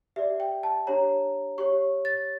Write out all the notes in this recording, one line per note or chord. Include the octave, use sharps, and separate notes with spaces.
G4 D5 E5
G5
A5
D4 G4 C#5 A#5
G4 C#5 C#6
A6